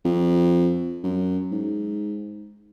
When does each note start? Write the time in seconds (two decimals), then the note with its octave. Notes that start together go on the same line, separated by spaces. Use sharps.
0.05 F2
1.03 F#2
1.52 G#2